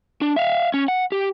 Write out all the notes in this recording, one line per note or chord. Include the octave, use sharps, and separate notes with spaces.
D4
E5 F5
C#4
F#5
G4